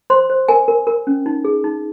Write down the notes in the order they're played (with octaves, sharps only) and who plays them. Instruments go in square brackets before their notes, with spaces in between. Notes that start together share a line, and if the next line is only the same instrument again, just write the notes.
[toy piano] C5 C6
C5
A#4 G#5
A#4
A#4
C#4
D#4
G#4
D#4